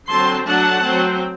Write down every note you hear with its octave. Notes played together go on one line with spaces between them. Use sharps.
D3 F#3 C4 A5 C6
F#3 A3 D4 F#5 A5
F#3 C4